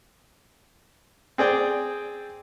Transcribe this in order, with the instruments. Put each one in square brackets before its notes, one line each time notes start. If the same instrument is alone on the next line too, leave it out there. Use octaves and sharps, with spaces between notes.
[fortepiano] C4 G#4 D5 G5